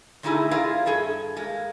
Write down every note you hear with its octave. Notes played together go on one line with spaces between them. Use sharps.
D3 A3 D#4 E4 G#4
E4 F4 G#4 A#4 D5 F5
G2 G#4 A4 E5
G#3 A#3